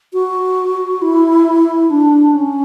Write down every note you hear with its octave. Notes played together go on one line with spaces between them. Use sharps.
F#4
E4
D4
C#4